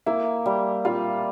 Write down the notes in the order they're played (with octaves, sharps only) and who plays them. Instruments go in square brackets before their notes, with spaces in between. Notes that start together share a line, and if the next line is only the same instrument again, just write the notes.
[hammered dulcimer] A#3 [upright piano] E4
[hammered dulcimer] G3
[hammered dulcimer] G3 [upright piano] F4